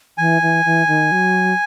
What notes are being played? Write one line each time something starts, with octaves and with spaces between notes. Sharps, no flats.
E3 G#5
E3
E3
D#3
F#3